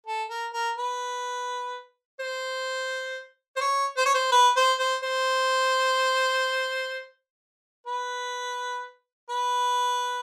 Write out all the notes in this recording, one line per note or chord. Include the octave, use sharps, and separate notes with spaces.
A4
A#4
A#4
B4
C5
C5
C#5
C5
C#5
C5
B4
C5
C5
C5
B4
B4